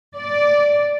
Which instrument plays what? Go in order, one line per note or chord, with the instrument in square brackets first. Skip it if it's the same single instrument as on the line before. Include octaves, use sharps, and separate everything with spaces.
[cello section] D5